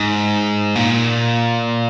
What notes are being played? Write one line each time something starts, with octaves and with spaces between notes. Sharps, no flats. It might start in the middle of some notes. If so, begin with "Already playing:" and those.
Already playing: G#2
A#2